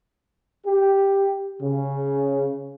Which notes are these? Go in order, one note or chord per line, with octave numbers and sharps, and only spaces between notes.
G4
C#3